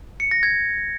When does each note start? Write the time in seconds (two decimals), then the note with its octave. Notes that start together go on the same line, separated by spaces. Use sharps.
0.20 C#7
0.31 A#6
0.43 G#6